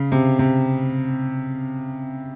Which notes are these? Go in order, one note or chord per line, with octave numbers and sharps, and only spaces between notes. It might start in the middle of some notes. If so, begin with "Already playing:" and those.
Already playing: C#3
C3
C3